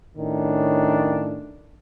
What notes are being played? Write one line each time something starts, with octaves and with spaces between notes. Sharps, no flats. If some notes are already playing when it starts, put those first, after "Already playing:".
A2 D#3 C#4 D4